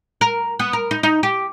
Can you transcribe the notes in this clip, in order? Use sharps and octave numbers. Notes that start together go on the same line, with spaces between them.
A#4
B3
A#4
D#4
D#4
G4